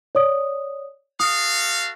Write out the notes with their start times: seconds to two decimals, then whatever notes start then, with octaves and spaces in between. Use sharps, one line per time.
0.15 C#5 D5 D#6
1.20 F#4 A4 F5 D#6